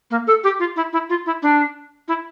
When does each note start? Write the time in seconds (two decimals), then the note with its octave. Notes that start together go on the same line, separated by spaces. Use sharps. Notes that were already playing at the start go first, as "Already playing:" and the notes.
0.10 A#3
0.27 A4
0.44 G4
0.59 F4
0.76 E4
0.93 E4
1.09 F4
1.26 E4
1.42 D4
2.08 E4